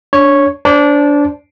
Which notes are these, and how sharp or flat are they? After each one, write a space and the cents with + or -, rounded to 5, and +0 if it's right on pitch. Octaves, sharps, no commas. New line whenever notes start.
D4 -20 C#5 -5
D4 -20 C5 +0 A5 -5